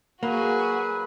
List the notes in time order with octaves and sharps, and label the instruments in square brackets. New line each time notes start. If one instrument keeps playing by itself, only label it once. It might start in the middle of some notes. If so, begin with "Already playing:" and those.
[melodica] F#3 B4 [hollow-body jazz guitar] A#3 [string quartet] F#4 G#4